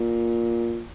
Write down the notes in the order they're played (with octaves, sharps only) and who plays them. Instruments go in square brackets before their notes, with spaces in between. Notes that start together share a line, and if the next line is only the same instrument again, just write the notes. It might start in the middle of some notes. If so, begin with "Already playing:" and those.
Already playing: [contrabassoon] A#2